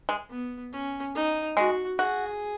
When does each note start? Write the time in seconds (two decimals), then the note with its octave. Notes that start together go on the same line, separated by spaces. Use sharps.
0.09 G#3
0.30 B3
0.72 C#4
1.15 D#4
1.57 G#3 F#4
1.99 F#4 G#4